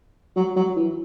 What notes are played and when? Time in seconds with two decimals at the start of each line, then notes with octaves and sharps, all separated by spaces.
0.36 F#3
0.56 F#3
0.76 E3